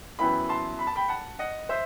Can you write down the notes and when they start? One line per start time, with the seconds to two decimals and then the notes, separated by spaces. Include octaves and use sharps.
0.19 F#2 E3 B3 E4 G5 B5
0.49 A5 C6
0.79 B5
0.87 A5
0.96 G5 B5
1.08 F#5 A5
1.39 D#5 F#5
1.69 C5 E5